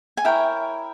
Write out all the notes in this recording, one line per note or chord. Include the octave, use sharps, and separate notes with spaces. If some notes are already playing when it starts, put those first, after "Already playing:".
G#5
E4 A#4 C#5 E5 G5